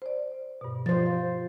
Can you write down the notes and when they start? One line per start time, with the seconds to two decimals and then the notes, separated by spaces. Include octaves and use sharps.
0.02 C5 D5
0.61 G2 B2
0.86 F3 C5 A6
1.06 F5